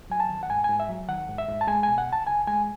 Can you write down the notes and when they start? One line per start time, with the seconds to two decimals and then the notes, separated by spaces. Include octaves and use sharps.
0.10 F#3 G#5
0.20 A5
0.29 D#3
0.43 F#5
0.50 G#2 G#5
0.64 G#2 G#5
0.80 E5
0.89 F#3
1.08 D#3 F#5
1.29 G#2
1.38 E5
1.48 G#2
1.61 A5
1.67 G#3 G#5
1.83 B2 G#5
1.98 F#5
2.07 C#2
2.13 A5
2.27 C#2 G#5
2.47 G#3 G#5